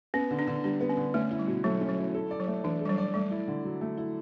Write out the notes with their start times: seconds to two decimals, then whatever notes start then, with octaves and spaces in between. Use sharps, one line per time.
0.14 B3 C#4
0.31 D3
0.39 D4
0.47 D3
0.64 G3 D4
0.80 B3
0.89 C#4
0.97 D3
1.14 A3 C#4
1.31 E4
1.39 G3
1.47 B2
1.64 F#3 A3
1.81 C#4
1.89 F#3
1.98 E4
2.14 A4
2.31 D5
2.40 F#3
2.48 A3
2.64 E3 D4
2.81 G3 A4
2.90 F#3
2.98 D5
3.14 G3 A3
3.31 E4
3.48 D3
3.65 F#3
3.81 A3
3.98 E4